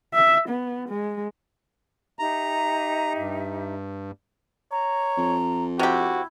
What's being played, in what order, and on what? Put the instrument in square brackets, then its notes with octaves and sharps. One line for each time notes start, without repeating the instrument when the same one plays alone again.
[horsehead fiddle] E5
B3
G#3
[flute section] D#4 G4 E5 [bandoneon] A#5
[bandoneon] G2
[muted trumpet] C#5 [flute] A#5
[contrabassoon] F2
[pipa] C3 G4 [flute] E4 [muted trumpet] F#4